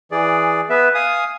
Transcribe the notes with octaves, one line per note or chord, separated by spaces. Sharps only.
E3 G#4 D5
B3 B4 E5
F5 G#5 D#6